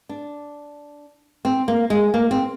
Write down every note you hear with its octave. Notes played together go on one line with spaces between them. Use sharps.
D4
C4
A#3
G#3
A#3
C4